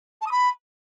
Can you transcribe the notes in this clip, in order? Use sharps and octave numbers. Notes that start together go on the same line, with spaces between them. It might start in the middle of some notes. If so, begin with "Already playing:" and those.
A5
D#6
B5